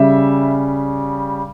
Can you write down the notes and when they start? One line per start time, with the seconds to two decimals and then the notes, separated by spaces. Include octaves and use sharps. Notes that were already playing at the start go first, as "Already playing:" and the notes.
Already playing: C#3 G3 E5